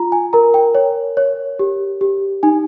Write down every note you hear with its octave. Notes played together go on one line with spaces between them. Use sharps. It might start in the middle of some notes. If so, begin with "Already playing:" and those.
Already playing: F4 A#5
G#5
A#4 A#5
G5
C#5
C#5
G4
G4
D#4 G#5